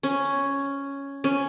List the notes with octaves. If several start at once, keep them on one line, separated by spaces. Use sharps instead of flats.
C#4
C#4